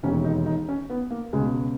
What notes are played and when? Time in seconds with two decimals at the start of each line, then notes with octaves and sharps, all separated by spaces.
0.03 E1 D#2 D#3 C#4
0.25 D#4
0.46 D#4
0.69 C#4
0.90 B3
1.10 A#3
1.33 C#2 B2 G#3